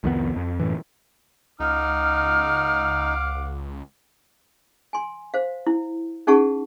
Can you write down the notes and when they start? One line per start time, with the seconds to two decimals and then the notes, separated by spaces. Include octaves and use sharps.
0.04 C2 F2 D#3 B3
0.36 F2
0.60 F#2 A2 E3
1.60 C#2 D#4 F5 F#5 D6 F6
4.93 G#5 C6
5.34 C5 F5
5.67 E4
6.27 C#4 D#4 G#4 F#5 A5 C#6